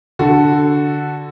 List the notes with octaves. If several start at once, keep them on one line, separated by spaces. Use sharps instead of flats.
D3 F#4 A4